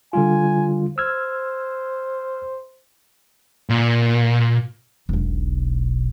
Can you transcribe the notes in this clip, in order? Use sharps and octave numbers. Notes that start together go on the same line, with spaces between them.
D3 G3 F4 G#5
C5 E6 F6 G#6
A#2
E1 B1